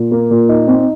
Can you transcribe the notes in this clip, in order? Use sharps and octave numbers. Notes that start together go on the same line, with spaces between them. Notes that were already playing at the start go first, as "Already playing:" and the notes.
Already playing: A#2
A#3
A#2
D#4
C4